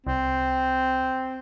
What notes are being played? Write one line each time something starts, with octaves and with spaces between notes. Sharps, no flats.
C2 C4